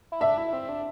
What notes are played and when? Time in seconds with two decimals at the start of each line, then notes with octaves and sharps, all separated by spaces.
0.12 E4
0.21 D4 E5
0.38 E4
0.53 C4
0.69 D4